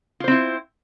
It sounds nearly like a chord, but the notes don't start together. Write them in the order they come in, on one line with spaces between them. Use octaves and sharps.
F4 C5 C4 E4